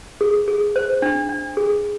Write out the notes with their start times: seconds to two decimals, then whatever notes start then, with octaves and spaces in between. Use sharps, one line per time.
0.21 G#4
0.48 G#4
0.76 C5
1.02 D4
1.29 D4
1.57 G#4